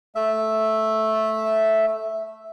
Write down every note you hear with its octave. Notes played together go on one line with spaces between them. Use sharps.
A3 E5